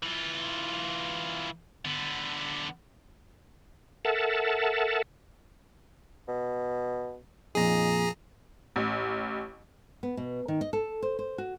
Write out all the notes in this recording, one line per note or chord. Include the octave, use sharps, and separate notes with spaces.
E3 F4
D3 B3
A4 A#4 E5 F#5 A5
B2
F2 A#2 D#4 G#4 A#5
A1
B3
B2
D#3
D#5
A4
C5
C5
F#4